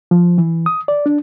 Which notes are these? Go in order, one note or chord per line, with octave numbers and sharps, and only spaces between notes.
F3
E3
D#6
D5
D4